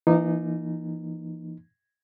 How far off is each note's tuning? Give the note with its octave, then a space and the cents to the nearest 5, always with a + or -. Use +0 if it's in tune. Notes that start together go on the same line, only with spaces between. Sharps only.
E3 +30 A#3 +10 D#4 -15